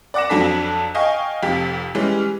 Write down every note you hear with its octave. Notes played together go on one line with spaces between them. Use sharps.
D5 F#5 D6 A#6 E7
F2 F#3 D4 A4 B6
D#5 F5 G5 G#5 C#6
F1 F2 G4 B6
E3 G3 G#3 C#4